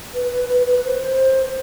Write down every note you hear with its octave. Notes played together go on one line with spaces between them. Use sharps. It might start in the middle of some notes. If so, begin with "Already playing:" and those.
B4
B4
B4
B4
C5